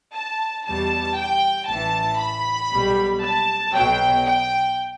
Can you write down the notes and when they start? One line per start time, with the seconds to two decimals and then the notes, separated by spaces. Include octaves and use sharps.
0.15 A5
0.67 E2 B2 G3 A5
1.18 G5
1.69 A1 A2 E3 A5
2.20 B5
2.72 B1 B2 G3
3.23 A5
3.74 B1 B2 F#3 G5
4.26 G5